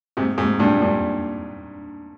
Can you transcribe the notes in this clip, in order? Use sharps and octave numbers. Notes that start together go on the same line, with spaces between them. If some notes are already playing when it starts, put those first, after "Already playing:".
G#2 C3
G#2 C3
G2 A#2
G2 A#2